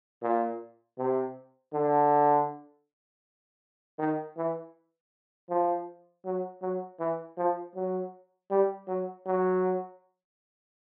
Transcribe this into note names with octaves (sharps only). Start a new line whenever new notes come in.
A#2
C3
D3
D#3
E3
F3
F#3
F#3
E3
F3
F#3
G3
F#3
F#3